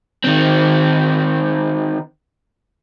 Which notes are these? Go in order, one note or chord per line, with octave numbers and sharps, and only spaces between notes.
D#3 C4